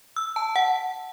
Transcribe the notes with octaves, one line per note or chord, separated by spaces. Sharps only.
E6
A5
F#5